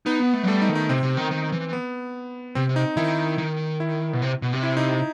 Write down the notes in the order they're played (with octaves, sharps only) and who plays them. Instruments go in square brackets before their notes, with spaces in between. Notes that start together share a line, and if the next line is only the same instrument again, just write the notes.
[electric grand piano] B3 [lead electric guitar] D#4
[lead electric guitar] B3
A3
F#3
[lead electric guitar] G3 [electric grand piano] A3
[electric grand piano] D#4
[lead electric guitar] D#3
[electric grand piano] D#4
[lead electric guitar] C3 [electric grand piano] C4
[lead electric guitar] C3
D#3
D#3
E3
[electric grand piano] B3
[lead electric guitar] C3 [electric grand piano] C4
[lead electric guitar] C3
[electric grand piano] D#4
[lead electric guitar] D#3 [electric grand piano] E4
[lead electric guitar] D#3
[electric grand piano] E4
[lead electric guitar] B2
C3
B2
C3
[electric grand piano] E4
D#4